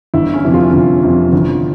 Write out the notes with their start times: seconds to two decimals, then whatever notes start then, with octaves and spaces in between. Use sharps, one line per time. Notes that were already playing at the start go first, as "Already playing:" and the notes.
0.14 G1 E4
0.34 C#4
0.44 F2 C3 E3
0.54 F4
0.73 G1
1.03 F2 C3 E3
1.32 G1